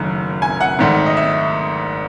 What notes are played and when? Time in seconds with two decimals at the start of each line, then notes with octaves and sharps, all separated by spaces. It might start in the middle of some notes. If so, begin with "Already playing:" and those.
Already playing: F#1 F#2 D#3 A3
0.42 G#5
0.61 F#5
0.79 G#1 G#2 D#3 A3
1.06 D#5
1.17 E5